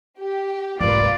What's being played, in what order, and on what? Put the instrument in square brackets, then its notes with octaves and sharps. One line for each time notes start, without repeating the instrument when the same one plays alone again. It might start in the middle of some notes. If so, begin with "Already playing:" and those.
[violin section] G4
[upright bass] F1 G#2 [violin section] A#3 F4 B4 [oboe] D5